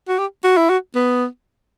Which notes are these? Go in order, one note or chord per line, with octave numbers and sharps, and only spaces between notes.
F#4
G4
F#4
E4
F#4
B3